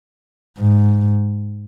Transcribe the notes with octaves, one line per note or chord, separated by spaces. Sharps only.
G#2